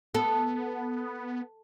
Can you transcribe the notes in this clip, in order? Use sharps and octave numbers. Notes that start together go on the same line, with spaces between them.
B3 A4